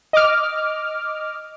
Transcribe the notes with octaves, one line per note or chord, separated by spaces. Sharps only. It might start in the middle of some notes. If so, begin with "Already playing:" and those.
D#5 D6 F6